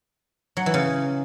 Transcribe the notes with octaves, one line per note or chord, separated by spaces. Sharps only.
F#3
E3
C#3